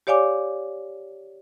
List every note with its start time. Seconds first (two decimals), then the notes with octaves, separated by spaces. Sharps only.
0.07 G4 C#5 D5 F5 G#5 D6